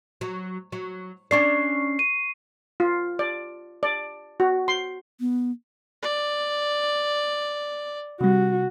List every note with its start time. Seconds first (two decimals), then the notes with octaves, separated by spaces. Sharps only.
0.21 F#3
0.72 F#3
1.31 C#4 D4 D5 C#6 C7
1.99 D#7
2.80 F4
3.19 D5
3.83 D5
4.40 F#4
4.68 C6
5.20 B3
6.02 D5
8.21 C3 G3 F#4